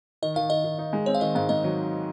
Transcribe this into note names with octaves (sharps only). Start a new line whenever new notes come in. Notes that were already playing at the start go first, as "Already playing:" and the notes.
D#3 D#5
D#3 F5
D#3 D#5
D#3
D#4
G#3
C4 C#5
F5
D#3 D#5
G#2 F5
G#2 D#5
F#3